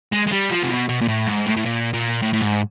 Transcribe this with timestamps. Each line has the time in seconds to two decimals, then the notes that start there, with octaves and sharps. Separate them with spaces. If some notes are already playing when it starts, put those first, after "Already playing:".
0.12 G#3
0.27 G#3
0.32 G3
0.50 F3
0.63 C3
0.70 B2
0.89 B2
1.01 A#2
1.08 A2
1.27 G#2
1.46 A2
1.57 A2
1.66 A#2
1.94 A#2
2.22 A2
2.33 A2
2.41 G#2